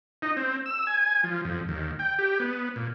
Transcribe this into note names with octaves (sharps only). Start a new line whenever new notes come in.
D#4
C4
E6
G#5
F3
F2
D#2
G5
G4
B3
A#2